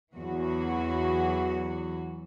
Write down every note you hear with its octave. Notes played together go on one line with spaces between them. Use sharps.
E2 E3 F#3 F#4